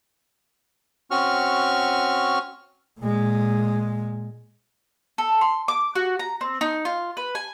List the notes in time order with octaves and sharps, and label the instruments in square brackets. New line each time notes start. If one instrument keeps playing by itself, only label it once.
[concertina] C4 C#4 F#4 C#6 F6
[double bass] A#2 G#3
[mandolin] A4
C6
D6
F#4
A#5
C4
D#4
F4
B4
G#5